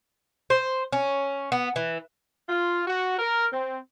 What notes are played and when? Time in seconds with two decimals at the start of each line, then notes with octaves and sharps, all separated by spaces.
0.50 C5
0.92 C#4
1.52 B3
1.76 E3
2.49 F4
2.87 F#4
3.19 A#4
3.53 C4